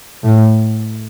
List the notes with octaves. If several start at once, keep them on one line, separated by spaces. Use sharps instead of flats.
A2